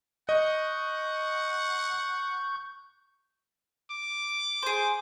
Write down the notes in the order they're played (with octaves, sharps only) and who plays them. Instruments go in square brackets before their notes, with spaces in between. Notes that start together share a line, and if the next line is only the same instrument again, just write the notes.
[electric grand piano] D#5 [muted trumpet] F#5 [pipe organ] C#6 G6
[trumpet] D6
[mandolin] G#4 C5